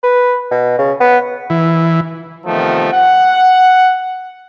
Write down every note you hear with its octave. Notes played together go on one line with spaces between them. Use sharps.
B4
B2
C#3
B3
E3
C3 D#3 F3 A3 B3
F#5